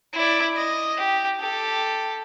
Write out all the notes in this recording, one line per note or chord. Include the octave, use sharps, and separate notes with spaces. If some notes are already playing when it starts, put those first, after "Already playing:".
E4 D5
D#5
G4
G4 A4